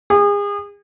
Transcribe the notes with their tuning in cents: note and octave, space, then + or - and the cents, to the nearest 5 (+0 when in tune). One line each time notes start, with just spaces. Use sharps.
G#4 -35